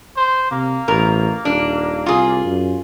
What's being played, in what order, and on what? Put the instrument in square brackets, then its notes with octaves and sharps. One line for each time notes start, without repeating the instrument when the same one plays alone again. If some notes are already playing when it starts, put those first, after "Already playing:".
[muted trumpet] C5
[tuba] C3 [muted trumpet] A#3
[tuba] A1 [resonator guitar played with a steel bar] B2 A#4
[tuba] D#1 [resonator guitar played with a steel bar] D4
[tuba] C2 [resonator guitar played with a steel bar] F4 G#4
[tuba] F#2